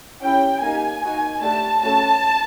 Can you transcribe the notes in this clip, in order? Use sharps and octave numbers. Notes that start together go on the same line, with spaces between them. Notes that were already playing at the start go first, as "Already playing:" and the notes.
C#4 E4 G4 G5
A#3 D#4 G4 G#5
A#3 D#4 F#4
A3 D4 G4 A5
A3 C#4 F#4 A4 A5